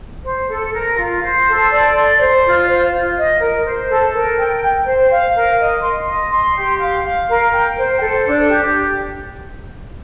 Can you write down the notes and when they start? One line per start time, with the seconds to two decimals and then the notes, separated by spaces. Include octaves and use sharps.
0.24 C5
0.49 A4
0.74 A#4
0.97 F4
1.22 C5
1.47 A4
1.70 D5
1.95 C6
2.19 C5
2.44 F4
2.67 C5
2.91 F4
3.16 D#5
3.39 A#4
3.64 C5
3.89 A4
4.13 A#4
4.37 G5
4.61 G5
4.85 C5
5.10 F5
5.34 A#4
5.58 D#5
5.82 C6
6.06 D#5
6.31 C6
6.55 G4
6.80 F5
7.03 F5
7.28 A#4
7.51 G5
7.76 C5
8.01 A4
8.25 D4
8.48 G4